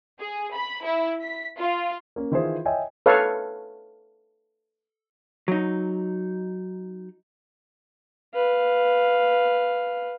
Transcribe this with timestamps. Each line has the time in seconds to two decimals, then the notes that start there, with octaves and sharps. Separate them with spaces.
0.20 G#4
0.54 B5
0.85 E4
1.21 B6
1.59 F4
2.16 A#3 C#4
2.32 D#3 E3 E4 F4 G#4 C5
2.66 C#5 D#5 E5 G5 G#5
3.06 A4 B4 C#5 F5
5.48 F#3 D#4
8.34 B4 F5